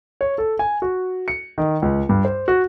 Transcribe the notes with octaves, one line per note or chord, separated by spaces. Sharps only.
C#5
A4
G#5
F#4
C#7
D#3
C#2
G2
C5
F#4